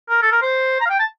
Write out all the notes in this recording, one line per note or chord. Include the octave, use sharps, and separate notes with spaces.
A#4
A4
A#4
C5
A#5
F5
G5
A5